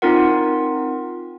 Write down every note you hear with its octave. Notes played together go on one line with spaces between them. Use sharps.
C4 D#4 F4 A#4 F#5